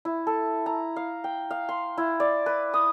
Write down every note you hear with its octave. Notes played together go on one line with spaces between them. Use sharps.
E4
A4
A#5
F5
G5
F5
C6
E4
D5
B4
D#6